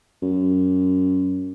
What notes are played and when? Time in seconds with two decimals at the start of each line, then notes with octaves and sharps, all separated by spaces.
0.22 F#2